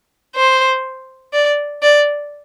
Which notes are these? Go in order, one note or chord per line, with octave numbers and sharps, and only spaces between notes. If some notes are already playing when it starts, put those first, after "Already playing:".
C5
D5
D5